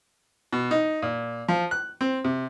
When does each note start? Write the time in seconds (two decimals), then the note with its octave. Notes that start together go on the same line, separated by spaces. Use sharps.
0.53 B2
0.71 D#4
1.02 A#2
1.48 F3
1.71 F#6
2.01 C4
2.25 C3